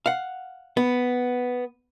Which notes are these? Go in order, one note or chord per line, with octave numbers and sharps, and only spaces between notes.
F5 F#5
B3